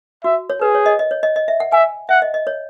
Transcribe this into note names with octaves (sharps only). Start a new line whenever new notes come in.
F#4 E5
C#5
G#4 B4
C#5
D#5
D#5
C#5
D#5
D#5
E5
F#5
E5 G#5
E5 F#5
D#5
D#5
C#5